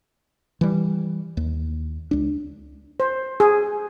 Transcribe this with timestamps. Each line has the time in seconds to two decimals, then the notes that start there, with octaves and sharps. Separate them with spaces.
0.61 E3 G3
1.37 D#2
2.11 C#2 D4
3.00 C5
3.40 G#4